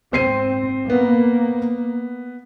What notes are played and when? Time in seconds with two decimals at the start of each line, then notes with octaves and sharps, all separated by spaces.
0.13 G#2 C4 C5 C7 D#7
0.90 A#3 B3